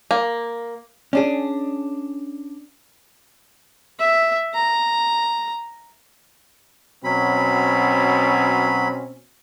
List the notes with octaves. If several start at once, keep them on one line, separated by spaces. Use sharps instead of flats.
A#3
C#4 D4 G#4
E5
A#5
B2 F#3 C4 C#4 B5